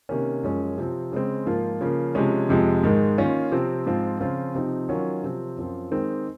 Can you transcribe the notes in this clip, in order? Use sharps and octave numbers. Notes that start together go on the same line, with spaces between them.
C3 D#3 A#3 C#4
F#2 F3 G#3 C#4
C3 F3 C4
C#3 G#3 C4
G#2 F3 A#3 F4
C#3 F3 A#3
C3 F3 G#3 C#4
F2 C3 F3 G#3
G#2 D#3 G#3
D#3 A#3 C#4 F4
C3 F3 C4
G#2 F3 C4 F4
C#3 F3 C4 F4
C3 F3 C4 D#4
D#3 F#3 C#4 F4
C3 F3 C4
F#2 F3 C4 F4
D#3 G#3 C4 D#4